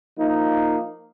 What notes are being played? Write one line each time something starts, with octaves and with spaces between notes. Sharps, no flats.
F3 A#3 D#4